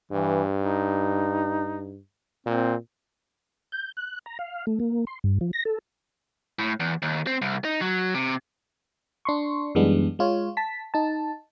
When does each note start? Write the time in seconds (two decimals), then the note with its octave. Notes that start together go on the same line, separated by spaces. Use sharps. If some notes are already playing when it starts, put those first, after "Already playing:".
0.12 G2 E3
0.61 D#4
2.46 A#2 C4
3.72 G6
3.97 F#6
4.26 A#5
4.39 F5
4.67 A3
4.80 A#3
5.07 C6
5.24 G2
5.41 F3
5.53 A#6
5.65 A4
6.59 A2
6.80 E2
7.02 D#2
7.27 C4
7.42 C2
7.65 D#4
7.81 F#3
8.15 C3
9.25 D4 C6 C#6
9.75 F#2 E3 G3 G#3 B3 D4
10.19 G#3 F4 C#5
10.57 A5 B6
10.94 D#4 A5